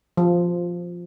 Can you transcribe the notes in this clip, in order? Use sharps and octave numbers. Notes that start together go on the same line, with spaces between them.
F3